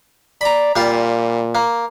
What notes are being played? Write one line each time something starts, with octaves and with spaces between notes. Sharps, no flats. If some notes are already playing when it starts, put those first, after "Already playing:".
D5 A#5 B5
A#2 G3 F4
A#3